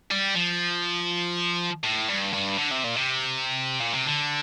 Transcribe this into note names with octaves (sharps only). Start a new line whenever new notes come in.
G3
F3
A2
G2
G2
D3
C3
A#2
C3
A#2
C3
D3